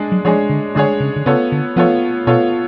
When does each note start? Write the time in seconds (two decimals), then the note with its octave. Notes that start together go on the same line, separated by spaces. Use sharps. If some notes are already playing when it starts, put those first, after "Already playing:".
Already playing: G#3 D4 G#4
0.12 F#3
0.25 F3 G#3 D4 G#4 C#5
0.50 D3
0.75 D3 G#3 D4 G#4 C#5
1.00 C#3
1.16 D3
1.26 C#3 B3 F4 A4 C#5
1.52 D3
1.76 F3 B3 F4 A4 C#5
2.27 B2 B3 F4 A4 C#5